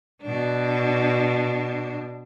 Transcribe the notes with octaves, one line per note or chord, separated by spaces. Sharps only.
B2 D4